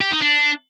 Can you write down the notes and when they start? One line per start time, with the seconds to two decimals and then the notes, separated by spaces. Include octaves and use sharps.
0.01 G4
0.11 D#4
0.22 D4